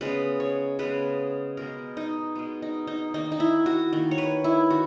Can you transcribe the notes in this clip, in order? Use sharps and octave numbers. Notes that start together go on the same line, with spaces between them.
C#3 G#3 B3 B4
C#5
C#3 G#3 B3 B4
B2 G#3 B3 A#4
D#4
B2 G#3 B3
D#4
D#4
D#3 A#3 D#4
D#4
E4
F#4
D#3 A#3
C#5
B4
E4
D#3 F#4